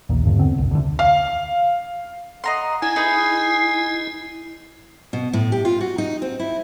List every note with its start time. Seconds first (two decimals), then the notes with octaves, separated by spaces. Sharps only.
0.09 A#1 D#2 A#2
0.24 E1 G2 D3
0.39 E2 D3 C4
0.58 F1 C2
0.71 D2 D3
0.99 F5
2.44 D#5 F#5 A#5 C6
2.82 D4 E4 G#5 G#6
2.96 D#4 G#4 B4 C7
5.13 B2
5.33 A2
5.52 G4
5.65 F4
5.81 F#4
5.98 D#4
6.22 C4
6.40 E4